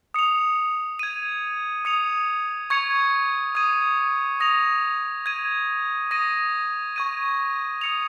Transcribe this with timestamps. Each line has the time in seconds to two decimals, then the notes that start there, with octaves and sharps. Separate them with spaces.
0.14 D#6 C#7 F7
0.99 G#6 D#7
1.85 D#6 C#7 F7
2.70 C#6 G#6 C#7 F7
3.55 D#6 G#6 D#7
4.40 D#6 A#6 F7
5.26 G#6 D#7
6.11 D#6 A#6 D#7
6.96 C#6 G#6 D#7
7.81 D#6 C#7 F7